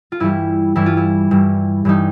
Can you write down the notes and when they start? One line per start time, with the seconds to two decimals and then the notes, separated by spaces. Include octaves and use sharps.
0.12 F4
0.20 G2 E3 G3 E4
0.76 G2 E3 G3 E4
0.86 F4
0.97 E4
1.31 G2 E3 G3
1.85 G2 E3 G3 D#4